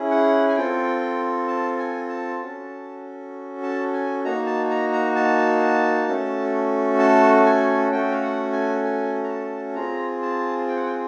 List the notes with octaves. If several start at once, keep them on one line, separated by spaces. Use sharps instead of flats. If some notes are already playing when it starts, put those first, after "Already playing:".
Already playing: C#4 E4 G#4
F#5
G#5
C4 F4 A4 G5
A5
G#5
A5
C#4 F#4 A4
A5
G#5
A#3 D#4 F#4 A#5
A5
A#5
A#5
A5
A3 C#4 F#4 A4
A5
G#5
A3 C#4 F#4 A4 G5
F5
F#5
G#5
G#5
A#5
A5
C4 F4 G#4 A#5
A5
G5
F#5
G5